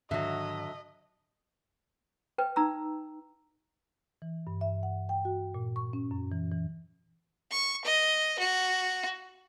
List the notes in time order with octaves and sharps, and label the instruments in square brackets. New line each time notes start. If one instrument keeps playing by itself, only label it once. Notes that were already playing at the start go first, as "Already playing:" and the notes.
[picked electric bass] G#2 D#3 [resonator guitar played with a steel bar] D3 F#3 [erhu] D#5 [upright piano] E5
[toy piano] B4 G5
D#4 A#5 E6
[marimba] E3
G2
E5
F#5
G5
F#4
A#2
C#6
C#4
F#2
E3
E3
[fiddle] C#6
D#5
F#4